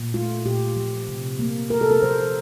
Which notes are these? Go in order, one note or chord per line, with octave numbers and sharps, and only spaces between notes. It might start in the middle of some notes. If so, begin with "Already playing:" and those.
Already playing: A#2
A3 F4
A#2 G4
F3
C3
A#3
C3 A#4
A4
A#4
F3 C5